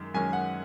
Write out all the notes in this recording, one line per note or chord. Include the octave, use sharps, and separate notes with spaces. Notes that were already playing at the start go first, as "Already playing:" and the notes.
Already playing: F#2 D#3 G#3
F#2 D#3 G#3 C#4 G#5
F#5